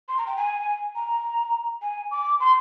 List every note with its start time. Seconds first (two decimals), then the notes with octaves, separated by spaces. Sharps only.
0.09 C6
0.17 A#5
0.27 G5
0.37 G#5
0.95 A#5
1.82 G#5
2.11 D6
2.40 C6